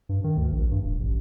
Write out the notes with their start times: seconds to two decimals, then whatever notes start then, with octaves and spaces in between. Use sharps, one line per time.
0.09 G2
0.24 D#3
0.37 D2
0.52 A#1
0.71 G2
0.85 D#1
1.00 A1